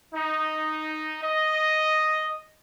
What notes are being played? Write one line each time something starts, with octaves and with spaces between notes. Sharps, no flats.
D#4
D#5